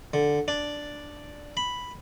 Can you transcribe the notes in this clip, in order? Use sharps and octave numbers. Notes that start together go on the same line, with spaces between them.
D3
D4
B5